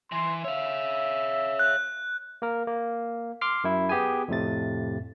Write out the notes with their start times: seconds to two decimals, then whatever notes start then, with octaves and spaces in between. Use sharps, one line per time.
0.12 E3 C6
0.44 C#5 E5 F5
1.59 F#6
2.42 A#3 A#4
2.67 A#3
3.41 C6 D6 F6 C7
3.64 F#2 E4
3.89 B3 G4 G#4 G#5
4.28 F2 A2 C3 A6